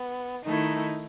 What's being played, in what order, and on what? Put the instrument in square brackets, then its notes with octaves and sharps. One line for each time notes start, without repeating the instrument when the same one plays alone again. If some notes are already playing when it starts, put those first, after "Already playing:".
Already playing: [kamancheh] B3
[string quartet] D#3 A3 E4 [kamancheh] D#4